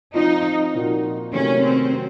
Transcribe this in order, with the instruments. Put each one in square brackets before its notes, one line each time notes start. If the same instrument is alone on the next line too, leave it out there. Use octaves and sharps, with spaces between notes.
[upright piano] F3 C4 F4 [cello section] D#4
[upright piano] A#2 F3 A#3 D#4 F#4
[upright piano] C3 D#3 F#3 A3 [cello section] C#4
[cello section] C4
[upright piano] F#3 C4